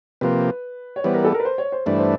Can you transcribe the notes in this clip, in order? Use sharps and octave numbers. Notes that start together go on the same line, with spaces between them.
C3 F3 A#3 B4
C#5
E3 G3 B3 C5
A#4
A4
A#4
B4
C5
C#5
C5
G2 E3 A3 D4 C5
C5